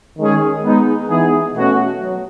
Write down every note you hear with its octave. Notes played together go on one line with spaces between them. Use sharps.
D#3 G#3 C#4 G#4
G#3 B3 D#4
E3 B3 D#4 G#4
B2 A3 C#4 F#4
F#3